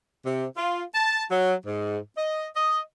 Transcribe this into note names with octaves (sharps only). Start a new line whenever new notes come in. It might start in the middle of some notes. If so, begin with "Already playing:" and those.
C3
F4
A5
F#3
G#2
D#5
D#5